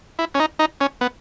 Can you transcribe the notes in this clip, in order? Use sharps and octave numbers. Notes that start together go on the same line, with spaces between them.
E4
C#4
D#4
D#4
C#4
B3